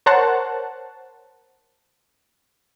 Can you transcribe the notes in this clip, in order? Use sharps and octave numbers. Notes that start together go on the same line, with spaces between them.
A#4 C5 C#5 F#5 A5